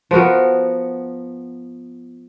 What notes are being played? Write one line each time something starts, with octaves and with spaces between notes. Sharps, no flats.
F3 B3 F#4 A#4